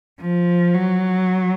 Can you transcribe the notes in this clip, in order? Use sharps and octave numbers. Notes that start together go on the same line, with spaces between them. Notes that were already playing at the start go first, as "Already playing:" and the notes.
F3
F#3